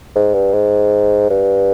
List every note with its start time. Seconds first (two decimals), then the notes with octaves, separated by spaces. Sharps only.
0.15 G#2
0.34 G2
0.53 G#2
1.30 G2